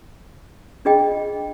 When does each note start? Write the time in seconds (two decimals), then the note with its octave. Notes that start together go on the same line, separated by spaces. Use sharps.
0.85 D4 F4 G#4 D#5 G5